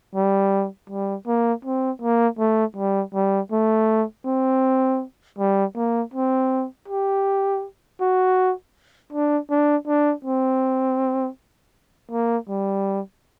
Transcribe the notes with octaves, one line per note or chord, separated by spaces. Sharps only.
G3
G3
A#3
C4
A#3
A3
G3
G3
A3
C4
G3
A#3
C4
G4
F#4
D4
D4
D4
C4
A#3
G3